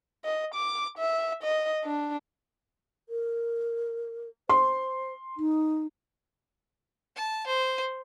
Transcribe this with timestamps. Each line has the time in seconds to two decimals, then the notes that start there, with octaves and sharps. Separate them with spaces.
0.25 D#5
0.55 D6
0.98 E5
1.43 D#5
1.84 D4
3.09 A#4
4.49 C5 C6
5.37 D#4
7.16 A5
7.47 C5